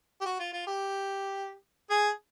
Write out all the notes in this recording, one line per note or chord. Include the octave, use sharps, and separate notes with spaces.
G4
F#4
F4
F4
G4
G#4